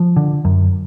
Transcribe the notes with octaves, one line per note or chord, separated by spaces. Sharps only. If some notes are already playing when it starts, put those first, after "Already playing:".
Already playing: F3
D3
F#2